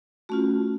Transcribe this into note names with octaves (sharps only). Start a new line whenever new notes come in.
A3 C#4 F4 F#4